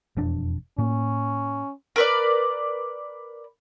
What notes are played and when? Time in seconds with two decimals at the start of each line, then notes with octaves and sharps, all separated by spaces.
0.17 E1 F2 D4
0.78 A2 A#3 C#4
1.96 A#4 B4 D5